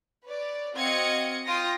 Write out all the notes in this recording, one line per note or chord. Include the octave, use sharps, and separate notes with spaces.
B4 C#5 D5
C4 F#4 D#5 F5 G#6 C#7
F4 G5 C6 D#6 A#6